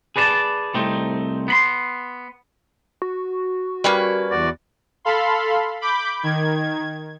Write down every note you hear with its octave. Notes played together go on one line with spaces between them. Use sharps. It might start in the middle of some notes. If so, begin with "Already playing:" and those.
G#4 B4 D5 E5 A5
C2 A3 C4 D#4
B3 B5 C6
F#4
G3 A#3 C#4 B4
E2 F#4 D5
A4 F5 B5 C6
B5 D6 G6
D#3 G#6